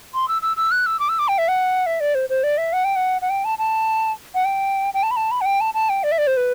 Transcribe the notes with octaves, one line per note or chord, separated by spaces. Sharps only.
C6
E6
E6
E6
F#6
E6
D6
E6
D6
G5
E5
F#5
E5
D5
C5
C5
D5
E5
F#5
G5
F#5
F#5
G5
A5
A5
F#5
G5
G5
A5
B5
A5
B5
F#5
G5
A5
A5
G5
D5
E5
D5
C5
B4